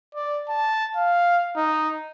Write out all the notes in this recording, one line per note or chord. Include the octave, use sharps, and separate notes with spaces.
D5
A5
F5
D#4